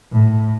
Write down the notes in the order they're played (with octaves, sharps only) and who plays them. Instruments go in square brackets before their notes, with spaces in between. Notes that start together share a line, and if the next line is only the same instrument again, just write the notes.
[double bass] A2